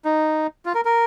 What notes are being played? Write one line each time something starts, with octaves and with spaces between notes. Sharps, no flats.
D#4
F4
A#4
A#4